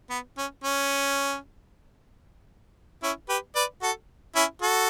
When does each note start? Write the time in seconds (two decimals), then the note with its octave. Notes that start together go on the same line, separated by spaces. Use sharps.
0.10 B3
0.37 C#4
0.64 C#4
3.03 C#4 E4
3.29 G4 B4
3.55 B4 D5
3.82 F#4 A4
4.35 C#4 E4
4.62 F#4 A4